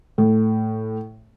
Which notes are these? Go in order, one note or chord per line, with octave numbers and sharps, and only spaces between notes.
A2